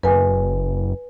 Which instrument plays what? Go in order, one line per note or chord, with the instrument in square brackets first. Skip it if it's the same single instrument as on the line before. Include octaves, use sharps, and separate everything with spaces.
[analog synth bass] F#1 [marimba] B4 G#5